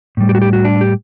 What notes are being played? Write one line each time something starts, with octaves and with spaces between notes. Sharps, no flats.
A2 G3
G4
F#4
G4
F#4
D4
G4